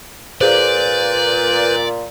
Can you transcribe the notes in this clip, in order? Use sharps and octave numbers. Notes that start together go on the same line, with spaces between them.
A#2 G#4 B4 C5 D5 G6